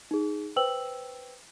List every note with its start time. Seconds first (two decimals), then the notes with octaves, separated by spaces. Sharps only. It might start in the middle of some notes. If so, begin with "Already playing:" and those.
0.11 D#4 G#4
0.56 B4 C5 G5 E6 F#7